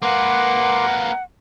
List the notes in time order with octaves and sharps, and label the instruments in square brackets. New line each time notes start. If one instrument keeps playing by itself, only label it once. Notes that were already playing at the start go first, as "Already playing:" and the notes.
[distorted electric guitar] A#3 B4 [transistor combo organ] A#4 C6 D6 [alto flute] F#5